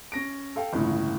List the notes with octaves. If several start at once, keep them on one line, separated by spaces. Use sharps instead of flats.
C#4 A#6 D7
A4 F5 G5
G1 C#2 A2 C#3 E3